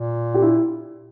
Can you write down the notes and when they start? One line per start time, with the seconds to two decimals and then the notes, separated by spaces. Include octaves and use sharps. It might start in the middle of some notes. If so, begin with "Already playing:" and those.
Already playing: A#2
0.34 G4
0.42 E4